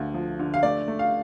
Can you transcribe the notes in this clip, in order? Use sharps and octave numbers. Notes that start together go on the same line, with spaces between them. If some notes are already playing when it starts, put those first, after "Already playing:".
Already playing: D2 D3
F3
D3
F5
A3 D5
A3
F5